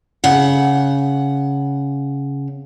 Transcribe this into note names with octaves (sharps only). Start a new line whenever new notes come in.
C#3 F#5